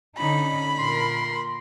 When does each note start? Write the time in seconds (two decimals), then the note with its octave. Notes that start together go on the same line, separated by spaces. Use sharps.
0.18 D3 C#4 D#4 B5
0.78 A#2 A#4 C6